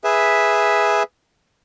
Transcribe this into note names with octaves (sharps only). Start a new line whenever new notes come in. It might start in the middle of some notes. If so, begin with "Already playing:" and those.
G#4 B4 E5